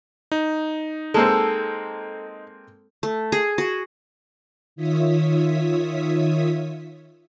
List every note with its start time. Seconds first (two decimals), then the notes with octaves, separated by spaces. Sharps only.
0.32 D#4
1.14 G#3 A#3 C4 A4
3.03 A3
3.32 G#4
3.58 F#4
4.76 D#3 F4 C#5 E5 D#6 B6